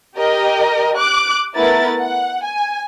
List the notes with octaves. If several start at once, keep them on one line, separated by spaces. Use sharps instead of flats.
G4 A#4 D#5
D6 F#6
A3 B3 E4 A#4 B4 A6
F#5
G#5